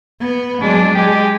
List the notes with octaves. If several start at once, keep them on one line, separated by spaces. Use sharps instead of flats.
B3
F#3 G#3 D4
G#3 G4